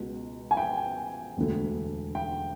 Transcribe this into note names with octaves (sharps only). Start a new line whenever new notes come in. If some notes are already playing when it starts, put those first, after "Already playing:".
Already playing: C#2 B2
G#5
G5
E1 D2 D3
G5